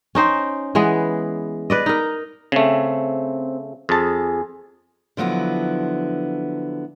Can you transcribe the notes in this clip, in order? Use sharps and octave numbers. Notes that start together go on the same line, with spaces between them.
C#4 D#4 C5 G5
E3 G#3 B3 G#4
B4 D5 D#5
D#4 A#4
C#3 A3 C4
F2 G#4 A5
D3 F3 F#3 B3 E4